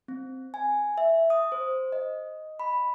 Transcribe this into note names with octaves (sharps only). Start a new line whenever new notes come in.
C4
G#5
E5
D#6
C5
D#5
B5